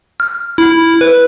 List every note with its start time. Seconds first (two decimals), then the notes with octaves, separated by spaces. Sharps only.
0.20 F6
0.58 E4
1.01 B4